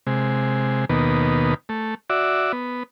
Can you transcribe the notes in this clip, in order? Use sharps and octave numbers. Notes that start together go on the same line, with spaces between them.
C3 G#3
D#2 B2 D#3 A#3 B3
A3
F#4 D5 E5
B3